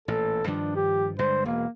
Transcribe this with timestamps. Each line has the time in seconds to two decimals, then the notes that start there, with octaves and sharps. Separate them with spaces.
0.08 A1 A#2 A4
0.47 G2 D#3 F3 D4
0.76 G4
1.19 G2 D3 G#3 C5
1.45 E1 A#3